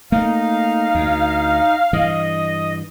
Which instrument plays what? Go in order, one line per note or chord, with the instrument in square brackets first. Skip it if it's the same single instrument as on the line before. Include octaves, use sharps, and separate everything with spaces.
[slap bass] A3 A#3 [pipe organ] D#4 [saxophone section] F5
[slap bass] D2
[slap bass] G2 E3 [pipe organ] D#5